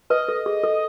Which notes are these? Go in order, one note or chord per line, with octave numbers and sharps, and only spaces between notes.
B4 D#5
A4
G#4
A4